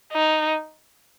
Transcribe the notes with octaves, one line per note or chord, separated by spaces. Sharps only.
D#4